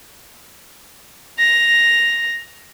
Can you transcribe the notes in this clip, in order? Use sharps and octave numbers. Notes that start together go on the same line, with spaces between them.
A#6 F7